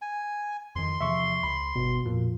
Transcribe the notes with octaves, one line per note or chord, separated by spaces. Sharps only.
G#5
F2 D#3 C6
E2 C3 F3 E5 C#6
C#2 B5
G1 B2
F2 A#2